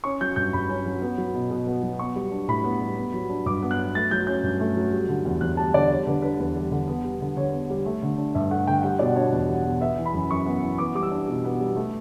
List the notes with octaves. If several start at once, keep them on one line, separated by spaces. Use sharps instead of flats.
C#4 C#6
F#3 G6
G2 G6
G2 B5
C#4
F#3
B3
F#3
B2
B2
B3
F#3
B3 C#6
G3
D4
A2 B5
B3
G3
B3
F#3
D4
G2 D6
B3
F#6
F#3
A3 A6
F#3 G6
C#4 G6
G2
A3
F#3
G3
D3
E2
E2 F#6
G3 A5
D3 D5
G3 C#5
D3 B4
D4 B4
E2 B4
G3
D3
B3
G3
D3
D3 C#5
B3
G3
A3
D3
D4
G2 E5
A3 F#5
D3 G5
G3 F#5
B2 D5
D4 C#5
E2
G3
B2
B3 E5
E3
B5
F#2
F#2 C#6
B3
E3
B3 D6
G3 D6
E6
D4
B2
B3
G3
A3